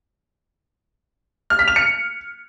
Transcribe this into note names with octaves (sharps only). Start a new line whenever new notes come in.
F6
B6
F7
C#7